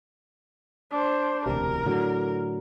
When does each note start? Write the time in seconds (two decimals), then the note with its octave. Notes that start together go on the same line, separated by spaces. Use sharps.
0.91 D4 C5
1.46 E1 D2 C3 A#4
1.85 A2 D3 F#3